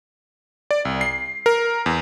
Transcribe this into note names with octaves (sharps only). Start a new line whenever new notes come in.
D5
C2
C7
A#4
E2